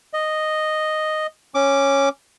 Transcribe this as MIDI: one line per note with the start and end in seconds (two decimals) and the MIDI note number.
0.13 1.27 75
1.55 2.09 61
1.55 2.09 86